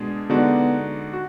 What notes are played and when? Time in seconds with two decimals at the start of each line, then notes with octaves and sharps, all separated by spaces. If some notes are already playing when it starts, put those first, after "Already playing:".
Already playing: B2 G#3 D4 G#4
0.30 D3 G#3 B3 D#4 F#4 D5
1.13 F#4